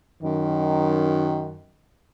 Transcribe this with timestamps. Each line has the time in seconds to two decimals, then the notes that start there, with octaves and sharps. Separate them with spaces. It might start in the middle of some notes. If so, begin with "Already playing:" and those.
0.23 F#2 D#3